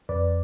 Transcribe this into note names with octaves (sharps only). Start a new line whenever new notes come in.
F2 B4 D5